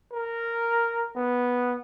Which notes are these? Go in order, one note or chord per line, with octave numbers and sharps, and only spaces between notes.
A#4
B3